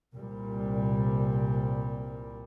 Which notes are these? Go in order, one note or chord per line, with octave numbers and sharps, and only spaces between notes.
C2 A#2 G3